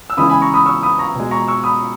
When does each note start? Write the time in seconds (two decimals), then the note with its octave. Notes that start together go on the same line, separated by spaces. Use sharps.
0.10 E6
0.17 C#3 E3 G#3 B5 D#6
0.30 G#5 B5
0.42 A#5 C#6
0.54 B5 D#6
0.66 C#6 E6
0.83 B5 D#6
0.99 A#5 C#6
1.15 B2 G#3
1.31 A#5 C#6
1.48 C#6 E6
1.64 B5 D#6